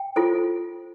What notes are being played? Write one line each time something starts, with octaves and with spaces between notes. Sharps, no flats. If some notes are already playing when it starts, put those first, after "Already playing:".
Already playing: G5
F4 A4 C5